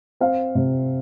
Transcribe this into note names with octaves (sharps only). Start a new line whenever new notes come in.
C4 F5
C3